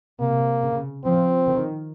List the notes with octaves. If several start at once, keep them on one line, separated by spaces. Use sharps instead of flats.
C3 A#3
C#3
F3 C4
D#3